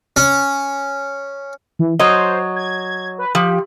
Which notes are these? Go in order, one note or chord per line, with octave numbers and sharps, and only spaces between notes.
C#4
E3
F#3 C5 C#5 D#5
G#6
B4
F3 G4